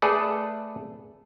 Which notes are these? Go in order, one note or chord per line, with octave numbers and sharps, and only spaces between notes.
A3 G#4 A4 B4 D5